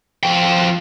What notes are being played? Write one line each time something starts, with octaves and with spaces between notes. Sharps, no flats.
F3 G5